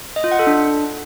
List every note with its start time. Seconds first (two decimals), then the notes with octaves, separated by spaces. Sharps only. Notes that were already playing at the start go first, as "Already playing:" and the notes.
0.16 D#5
0.24 F4
0.32 F#5
0.39 A4
0.47 D4